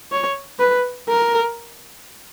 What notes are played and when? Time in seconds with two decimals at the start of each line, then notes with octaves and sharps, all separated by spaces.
0.12 C#5
0.59 B4
1.09 A#4